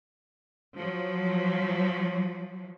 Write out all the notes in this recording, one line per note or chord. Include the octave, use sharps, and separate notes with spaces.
F3 F#3